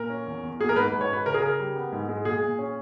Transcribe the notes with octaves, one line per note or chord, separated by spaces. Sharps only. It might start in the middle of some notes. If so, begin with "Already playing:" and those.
Already playing: A#2 A#4
C#4
E2
E2
A#3 G#4
A#4
G#2 B4
B4
G#2
C#5
C#4 B4
C#3 A#4
G#4
C#3 A#4
G3
B3
G#2
G#3
A#2 G#4
A#2
C#4